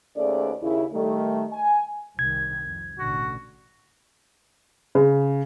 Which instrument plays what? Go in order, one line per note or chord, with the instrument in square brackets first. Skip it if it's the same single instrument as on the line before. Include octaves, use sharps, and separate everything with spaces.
[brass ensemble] D#2 A3 C#4 G#4 C5 D5
D#2 C#3 E4
D#3 G3 A3
G#5
[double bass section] C2 D#3 [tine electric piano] G#6
[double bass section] F2
[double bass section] A1 B2 D3 [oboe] F#4
[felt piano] C#3